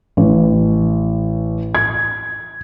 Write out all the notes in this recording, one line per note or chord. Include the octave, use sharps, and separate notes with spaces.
A1
G#6